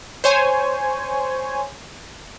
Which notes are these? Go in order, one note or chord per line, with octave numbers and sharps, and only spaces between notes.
C5 C#5 G#5